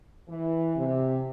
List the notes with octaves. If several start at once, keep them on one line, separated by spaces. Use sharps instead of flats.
E3
C3